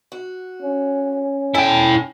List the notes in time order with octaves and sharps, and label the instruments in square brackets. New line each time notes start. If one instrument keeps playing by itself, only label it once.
[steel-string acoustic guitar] F#4
[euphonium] C#4
[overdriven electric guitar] E4 G5 [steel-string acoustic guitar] A4 G#5